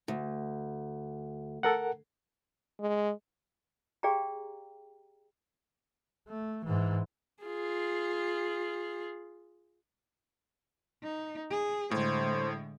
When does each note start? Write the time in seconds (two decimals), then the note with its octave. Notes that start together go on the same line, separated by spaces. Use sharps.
0.08 D2
1.63 A4 A#4 F#5
2.80 G#3
4.03 G4 G#4 D5 F5 G5 A#5
6.28 A3
6.65 G#2 E3
7.44 F4 G#4
11.03 D#4
11.51 G#4
11.91 A2 D3 G#3 C5